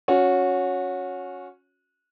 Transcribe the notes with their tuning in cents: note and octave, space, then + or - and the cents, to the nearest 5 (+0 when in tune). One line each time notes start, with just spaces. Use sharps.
C#4 +0 F#4 -20